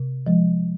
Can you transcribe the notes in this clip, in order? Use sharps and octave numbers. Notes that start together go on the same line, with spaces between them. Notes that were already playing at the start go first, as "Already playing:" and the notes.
Already playing: C3
F3 G#3